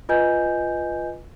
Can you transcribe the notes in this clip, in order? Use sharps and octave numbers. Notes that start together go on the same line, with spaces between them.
F4 B4 D#5 G#5 G6